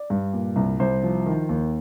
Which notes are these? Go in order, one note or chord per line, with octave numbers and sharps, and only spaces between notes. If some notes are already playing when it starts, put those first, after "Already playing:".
Already playing: D5
G2
A#2
C2
C2 C5
F3
D#3
D#2